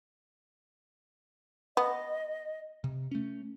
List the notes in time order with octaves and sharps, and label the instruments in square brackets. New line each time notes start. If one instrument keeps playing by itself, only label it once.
[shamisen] B3 [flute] D#5
[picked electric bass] C3
A3 C#4